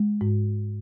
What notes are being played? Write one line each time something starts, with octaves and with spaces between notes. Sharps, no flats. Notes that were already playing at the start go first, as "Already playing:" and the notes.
Already playing: G#3
G#2